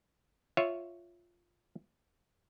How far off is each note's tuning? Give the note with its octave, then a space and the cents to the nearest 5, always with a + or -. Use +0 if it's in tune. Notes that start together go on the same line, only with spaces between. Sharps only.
F4 +0 C#5 +0 E5 +0